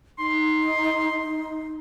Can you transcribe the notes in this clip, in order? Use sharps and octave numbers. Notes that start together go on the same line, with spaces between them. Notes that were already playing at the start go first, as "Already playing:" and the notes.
D#4 C6